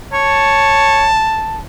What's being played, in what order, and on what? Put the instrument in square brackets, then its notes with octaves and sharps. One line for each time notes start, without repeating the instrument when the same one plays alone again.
[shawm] C#5 [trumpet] A5